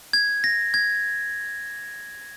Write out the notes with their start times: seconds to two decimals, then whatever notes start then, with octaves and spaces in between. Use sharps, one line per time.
0.13 G#6
0.44 A#6
0.74 G#6